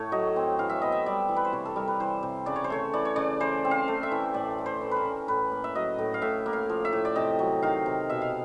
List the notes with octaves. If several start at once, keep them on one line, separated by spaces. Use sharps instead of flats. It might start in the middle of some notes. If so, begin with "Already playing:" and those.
Already playing: A2 A3 C#5
F#3 D#5
C4
E3 F5
E5
B3 D#5
E5
G3 D5
E3
B4
C5
C3 C#5
A4
G3 A#4
B4
E3 C5
C3
C#3 D5
C#5
C5
A3 C#5
E3 D5
C#5
C#3 D5
E3 C5
C4
F5
A3
E5
E3
A2 D5
A3
C5
E3
B4
A#4
C#4
A2 B4
A#3
E5
F#3 D#5
A2
F5
A2 E5
A#3
F5
F3
E5
A2
D5
C3 D#5
F#3
D#3 F5
C3
B2 E5
F5